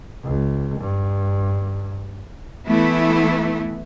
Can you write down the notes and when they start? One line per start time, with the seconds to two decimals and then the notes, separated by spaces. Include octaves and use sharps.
0.24 C#2
0.80 G2
2.68 E3 A3 B3 E4